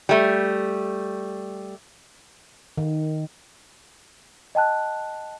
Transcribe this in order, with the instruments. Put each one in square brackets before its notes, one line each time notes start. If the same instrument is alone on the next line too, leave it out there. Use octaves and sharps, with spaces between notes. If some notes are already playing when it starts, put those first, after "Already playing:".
[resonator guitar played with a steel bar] G3 A3
[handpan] D#3
[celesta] D#5 G5 A5 F#6